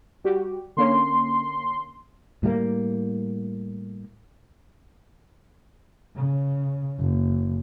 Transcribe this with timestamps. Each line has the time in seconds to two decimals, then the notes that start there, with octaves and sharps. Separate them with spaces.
0.24 G3 F#4 G4
0.77 D3 A#3 C#4 C6
2.43 A2 G3 A3 A#3
6.16 C#3
6.99 F#1